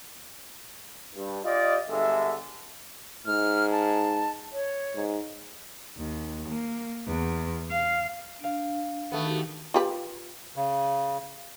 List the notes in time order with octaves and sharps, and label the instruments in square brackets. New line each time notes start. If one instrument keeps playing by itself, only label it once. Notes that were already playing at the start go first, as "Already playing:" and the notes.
[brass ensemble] G2
F4 G4 D5 D#5
G1 D3 G#3 A4 E5
[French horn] G#2 [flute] F6
[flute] A5
C#5
[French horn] G#2
[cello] D#2
A#3
E2
F5
[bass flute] D4 [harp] F5 D7
[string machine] D#3 F#4 G4 [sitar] A3 B3
[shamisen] F4 G4 B4
[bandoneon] C#3